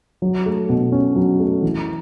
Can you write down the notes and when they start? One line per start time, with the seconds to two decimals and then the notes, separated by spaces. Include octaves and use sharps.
0.22 F#3
0.46 A3
0.69 B2
0.92 C#4
1.16 F#3
1.40 A3
1.62 E3